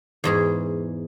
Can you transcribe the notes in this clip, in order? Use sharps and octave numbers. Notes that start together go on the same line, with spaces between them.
E2 G#2 G#4